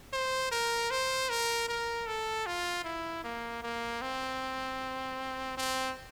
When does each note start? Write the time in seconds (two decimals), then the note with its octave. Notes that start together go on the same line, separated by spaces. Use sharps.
0.13 C5
0.52 A#4
0.91 C5
1.30 A#4
1.69 A#4
2.07 A4
2.47 F4
2.84 E4
3.24 A#3
3.63 A#3
4.02 C4
5.57 C4